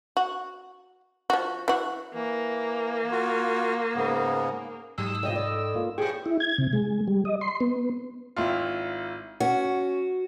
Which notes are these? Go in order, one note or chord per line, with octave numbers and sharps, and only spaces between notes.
F#4
F3 F#4
E3 F#4
E3 A#3
F4 F#4
G#2 C#3 B3
G#2 F#3 E6
F2 A2 C3 G3 D#5
D5
A#3 F4
A2 B3 G4 G#4 G5 C#6
E4
G#6
C3
G#3
G3
D#5
C6
B3
G#1 E4 F4
C#4 F#4